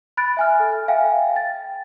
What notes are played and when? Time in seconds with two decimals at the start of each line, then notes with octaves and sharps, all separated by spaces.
0.17 B5 F#6 A6 D7
0.37 E5 G#5 F6
0.60 A4
0.88 E5 F5 G5 G#5
1.36 G5 A6